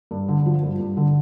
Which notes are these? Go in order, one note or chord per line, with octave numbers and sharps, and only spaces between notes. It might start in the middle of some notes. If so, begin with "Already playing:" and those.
G2
D3
F3
G2
G2
D3